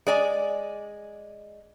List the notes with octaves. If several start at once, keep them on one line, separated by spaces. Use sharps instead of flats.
G#3 D5 G#5